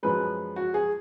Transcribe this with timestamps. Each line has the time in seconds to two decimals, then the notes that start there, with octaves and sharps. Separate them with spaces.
0.03 F#2 F3 G#3 B4
0.56 F#4
0.74 G#4